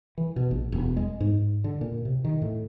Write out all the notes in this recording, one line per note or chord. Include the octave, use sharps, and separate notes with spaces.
E3
B2
A#1
E1
G#3
G#2
D3
A#2
C3
D#3
A2